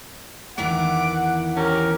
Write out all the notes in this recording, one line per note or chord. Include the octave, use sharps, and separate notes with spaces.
E2 D#3 E3 F#5 D6
C#4 G4 A#4